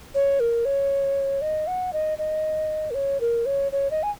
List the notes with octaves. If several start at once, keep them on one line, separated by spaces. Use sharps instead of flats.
C#5
A#4
C#5
D#5
F#5
D#5
D#5
A#4
C#5
A#4
C#5
C#5
D#5
G#5